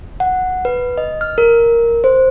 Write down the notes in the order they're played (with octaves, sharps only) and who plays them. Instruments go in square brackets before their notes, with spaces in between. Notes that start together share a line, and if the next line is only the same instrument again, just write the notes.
[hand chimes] F#5
B4
D#5
F6
A#4
C5